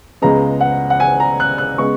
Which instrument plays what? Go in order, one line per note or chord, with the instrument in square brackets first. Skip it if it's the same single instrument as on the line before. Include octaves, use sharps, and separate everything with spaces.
[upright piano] C#2 C#3 G#3 B3 A#5
F#5
F#5
G#5
A#5
F#6
F#6
C#3 G#3 B3 C#6